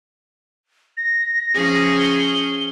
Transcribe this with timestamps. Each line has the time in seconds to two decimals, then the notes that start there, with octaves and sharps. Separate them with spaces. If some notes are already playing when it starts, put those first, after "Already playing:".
0.97 A#6
1.54 F3 C#4 G#4
1.99 G7